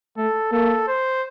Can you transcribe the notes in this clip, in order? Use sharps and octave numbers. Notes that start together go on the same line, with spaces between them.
A3 A4
A#3 A4
C5